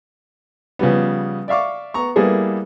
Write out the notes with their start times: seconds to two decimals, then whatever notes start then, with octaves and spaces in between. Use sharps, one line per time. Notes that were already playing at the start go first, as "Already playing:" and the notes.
0.79 C#3 F3 G3 B3
1.48 D5 E5 F5 C#6 D6
1.94 B3 A#5 C#6
2.16 G3 A#3 B3 E4 G#4 A4